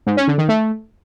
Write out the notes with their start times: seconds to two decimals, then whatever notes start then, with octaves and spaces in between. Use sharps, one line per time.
0.07 G#2
0.17 C#4
0.28 D3
0.38 D#3
0.49 A3